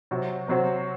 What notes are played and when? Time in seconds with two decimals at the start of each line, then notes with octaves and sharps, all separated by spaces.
0.11 C3 F#3 C4 F#4
0.48 C3 F#3 C4 F#4